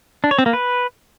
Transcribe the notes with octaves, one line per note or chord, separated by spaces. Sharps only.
D4
C#5
C4
A#3
B4